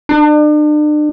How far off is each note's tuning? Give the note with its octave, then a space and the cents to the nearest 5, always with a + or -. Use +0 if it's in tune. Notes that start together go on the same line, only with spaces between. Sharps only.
D4 +40